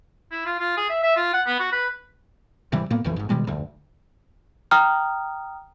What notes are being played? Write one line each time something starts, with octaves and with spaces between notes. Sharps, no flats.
E4
F4
F4
G#4
E5
E5
F4
F#5
B3
F#4
B4
G#1 C3 E3 G3
A2 A#3 B3
E1 B1 F2 E3
G#1 G#2
B2 D#3 G3 G#3
F1 D2
G5 A#5 D#6 F6